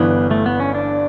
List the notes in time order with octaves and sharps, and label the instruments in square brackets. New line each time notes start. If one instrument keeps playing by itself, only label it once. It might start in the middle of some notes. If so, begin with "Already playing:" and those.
Already playing: [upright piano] G1 G2 E3 [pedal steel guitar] B3
[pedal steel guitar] A3
B3
C#4
D4